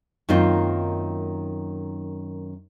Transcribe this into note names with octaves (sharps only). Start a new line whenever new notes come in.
F#2 D#3 A#3 C4 D#4 F4